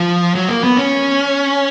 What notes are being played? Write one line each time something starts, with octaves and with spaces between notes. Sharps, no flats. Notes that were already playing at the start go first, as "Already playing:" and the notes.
Already playing: F3
F#3
A#3
B3
C#4